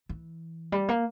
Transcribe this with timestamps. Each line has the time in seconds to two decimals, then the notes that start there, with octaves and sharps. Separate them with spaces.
0.09 E3
0.72 G3
0.89 A#3